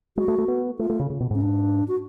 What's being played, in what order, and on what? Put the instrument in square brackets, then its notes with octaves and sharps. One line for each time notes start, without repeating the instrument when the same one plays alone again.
[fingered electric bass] G#3 [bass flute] F#4
[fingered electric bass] A3
A3
B3
[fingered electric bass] A3 [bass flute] F4
[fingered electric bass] A3
C#3
C#3
B2
[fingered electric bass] G#2 [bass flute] C#4
[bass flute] D4
F#4